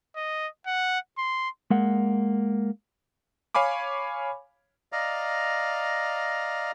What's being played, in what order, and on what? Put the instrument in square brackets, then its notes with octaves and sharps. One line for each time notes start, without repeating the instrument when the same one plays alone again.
[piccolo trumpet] D#5
F#5
C6
[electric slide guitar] G#3 A#3 F#5
[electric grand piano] C#5 F5 G#5 B5 D6
[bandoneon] D5 D#5 F5 A#5